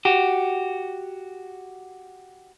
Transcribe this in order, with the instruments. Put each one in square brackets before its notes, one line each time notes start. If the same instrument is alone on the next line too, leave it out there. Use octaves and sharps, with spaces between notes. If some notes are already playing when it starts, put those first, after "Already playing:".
[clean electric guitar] F#4 G4